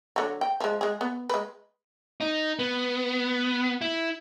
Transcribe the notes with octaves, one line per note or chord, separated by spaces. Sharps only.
D3 F#3
G5
F3 G#3
G#3 G#4
B3
G#3 B4
D#4
B3
E4